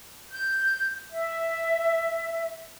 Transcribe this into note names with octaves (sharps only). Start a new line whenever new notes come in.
G6
E5